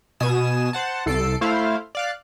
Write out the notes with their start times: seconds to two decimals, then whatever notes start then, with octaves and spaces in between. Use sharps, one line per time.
0.20 B2 G#5 D#6 E7
0.73 C5 F#5 A5
1.06 C2 A4 C7 D7
1.41 A3 E4 C5 F5
1.95 D5 F5 F#6